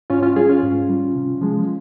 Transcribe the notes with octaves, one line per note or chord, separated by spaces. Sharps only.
G#2 C#4 F4
C#4 F4
G3 F4 G#4
C#4 F4
G#2
G3
C3
F3 G#3